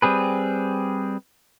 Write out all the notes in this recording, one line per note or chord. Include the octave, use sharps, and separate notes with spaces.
G3 C4 G#4 B4